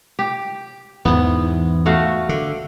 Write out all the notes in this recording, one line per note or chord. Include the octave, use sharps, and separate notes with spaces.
G4
E2 G#2 E3 B3
A3 F#4 F5
D3